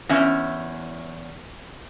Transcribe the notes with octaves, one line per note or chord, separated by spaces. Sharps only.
E2 C#4 E5